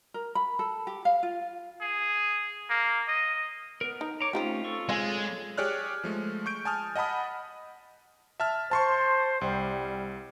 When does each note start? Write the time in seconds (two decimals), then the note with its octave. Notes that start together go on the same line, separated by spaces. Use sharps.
0.14 A#4
0.35 B5
0.59 A4
0.87 G4
1.05 F5
1.23 F4
1.81 G#4
2.70 A#3
3.08 D#5
3.81 B3 A#4
4.01 D#4
4.21 C#5 A#5 D6
4.33 A3 C4 C#4 D#4 F4 G4
4.64 A4 C#6
4.89 G#3 C4 G#4 A4 C#5 F5 G#5
5.58 G4 G#4 C#5 D5 F6 F#6
6.04 F3 G#3 A3
6.46 C#6 G6 D7
6.65 G#5 A5 D#6 F6
6.96 D#5 F#5 A5 B5 D#6
8.40 E5 A5 F6
8.71 C5 A5 C6 C#6
9.41 C2 G3